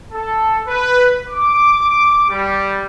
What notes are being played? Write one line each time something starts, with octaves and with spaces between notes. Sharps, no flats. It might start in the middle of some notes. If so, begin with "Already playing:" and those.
A4
B4
D6
G3